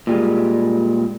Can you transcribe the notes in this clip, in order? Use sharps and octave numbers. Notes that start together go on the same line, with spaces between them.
A#2 G3 G#3